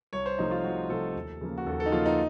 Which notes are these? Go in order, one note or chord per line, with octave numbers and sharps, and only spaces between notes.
C2 C#5
C5
C3 F3 A3 D#4
F4
C2 F#4
C3 F3 A3 A4
D#2
C#3 F3 A#3
F#4
D#2 A4
A4
D#4
C#3 F3 A#3 F4
D#4